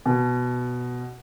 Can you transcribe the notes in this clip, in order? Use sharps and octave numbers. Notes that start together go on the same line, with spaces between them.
B2